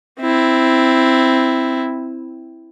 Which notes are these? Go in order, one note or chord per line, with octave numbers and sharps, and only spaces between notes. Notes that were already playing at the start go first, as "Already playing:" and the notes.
C4 E4